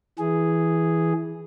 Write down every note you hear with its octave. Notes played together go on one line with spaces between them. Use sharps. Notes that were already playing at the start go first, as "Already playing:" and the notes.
E3 G#4